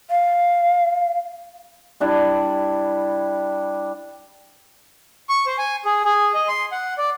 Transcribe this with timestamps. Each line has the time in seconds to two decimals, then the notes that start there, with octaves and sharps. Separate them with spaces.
0.10 F5
2.00 G3 D4 E4
5.29 C#6
5.46 C5
5.58 G#5
5.85 G#4
6.05 G#4
6.34 D#5
6.48 C6
6.72 F#5
6.98 D5